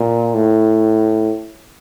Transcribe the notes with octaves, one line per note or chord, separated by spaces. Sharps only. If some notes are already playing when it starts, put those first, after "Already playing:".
Already playing: A#2
A2